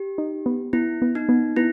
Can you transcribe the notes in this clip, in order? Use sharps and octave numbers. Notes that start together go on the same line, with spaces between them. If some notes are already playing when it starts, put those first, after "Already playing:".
Already playing: G4
D#4
B3
B3 E4
B3
D#4
B3
B3 E4